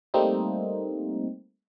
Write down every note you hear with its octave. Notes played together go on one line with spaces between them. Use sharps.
G3 A3 A#3 C4 D#4